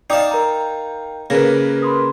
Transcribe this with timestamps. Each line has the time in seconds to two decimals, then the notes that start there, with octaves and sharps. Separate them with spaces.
0.10 D#4 D5 F5 G5 A5 D6 D#6
0.31 A#4 A#5
1.30 C#3 A#3 A#4 B4 A#6
1.82 B5 C6 D#6